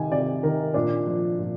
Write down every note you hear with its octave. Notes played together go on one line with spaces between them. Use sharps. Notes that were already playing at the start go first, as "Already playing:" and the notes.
Already playing: C3 D#3 G#5
C3 D5
D#3 A#4
A#2 D4
F3
A#2